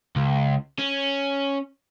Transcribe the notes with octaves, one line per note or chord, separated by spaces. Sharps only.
C#2
C#4